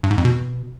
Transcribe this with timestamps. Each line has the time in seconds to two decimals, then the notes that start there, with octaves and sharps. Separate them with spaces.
0.03 G2
0.11 G#2
0.18 F2
0.25 B2